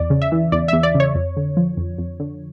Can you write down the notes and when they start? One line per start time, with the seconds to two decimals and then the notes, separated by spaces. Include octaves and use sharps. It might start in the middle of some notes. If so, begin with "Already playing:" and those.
Already playing: E2 D5
0.10 C#3
0.22 E5
0.32 E3
0.52 E2 D5
0.68 E2 E5
0.83 D5
0.95 C#3
1.00 C#5
1.15 F2
1.37 D3
1.57 F3
1.77 F2
1.98 F2
2.20 D3